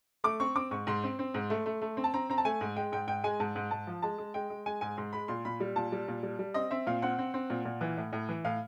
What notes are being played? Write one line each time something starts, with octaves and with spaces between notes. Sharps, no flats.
A3 D6
C4 C#6
C4 D6
G#2 C#6
G#2 C6
C4
C4
G#2
A3
A3
A3
C4
A5
C4 A#5
C4 A#5
A5
A3 G#5
G#2
G#3 G5
G#2 G5
G#2 G5
G#3 G#5
G#2 A5
G#2
G#2 A5
F3
G#3 A5
G#3
G#3 G5
G#3
G#3 G#5
G#2 G#5
G#2 C6
G#3 B5
A#2 C6
A#2 B5
G3
A#2 A5
G3
A#2
G3
G3
C4 D#5
C4 E5
A#2 F5
C4 F#5
C4
C4
A#2
A#2
E3
A2
A2
E3
A2 F5